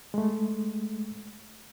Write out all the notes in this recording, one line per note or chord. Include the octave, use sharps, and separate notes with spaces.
G#3 A3